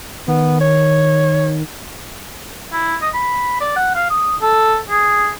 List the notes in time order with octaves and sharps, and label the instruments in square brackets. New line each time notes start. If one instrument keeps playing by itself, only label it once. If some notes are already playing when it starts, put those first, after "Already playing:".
[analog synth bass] D#3 [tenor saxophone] B3
[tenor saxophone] C#5
[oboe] E4
D#5
B5
D5
F#5
F5
D#6
A4
G#4